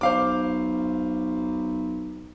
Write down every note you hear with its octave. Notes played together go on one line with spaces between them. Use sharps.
B1 C5 F5 D6